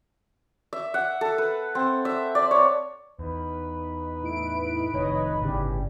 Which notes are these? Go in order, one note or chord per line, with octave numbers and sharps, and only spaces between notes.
E5
F#5
A4
B4
C4
E5
D5
C#5
E2 D#4 B4
A2 E4 D7
F1 A2 D#3 C#5 D#5
G1 A2 C#3 G3